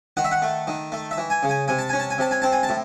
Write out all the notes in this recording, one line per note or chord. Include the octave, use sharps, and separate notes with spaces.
D#3 F#5
E5
F#5
A3
D#3
A3
E5
E3
G#5
C#3
G#5
C3 G#5
A5
C#4 G#5
A5
G#5
C3 A5
G#5
C4 A5
G#5
A5
A2